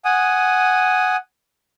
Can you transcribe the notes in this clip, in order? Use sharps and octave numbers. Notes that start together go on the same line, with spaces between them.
F#5 G#5 D#6